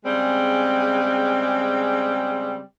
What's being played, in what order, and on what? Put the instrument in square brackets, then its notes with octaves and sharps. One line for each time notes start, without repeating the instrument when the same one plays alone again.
[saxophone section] C#3 G3 G#3 C4